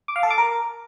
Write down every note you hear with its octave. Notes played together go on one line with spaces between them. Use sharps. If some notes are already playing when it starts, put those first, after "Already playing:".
D6
F5
A4
D6
A#4